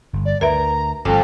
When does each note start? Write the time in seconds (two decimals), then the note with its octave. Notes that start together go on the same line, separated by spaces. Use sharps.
0.13 G1
0.25 D5
0.41 D2 A#4 B4 E5 A#5
1.05 G1 F2 A4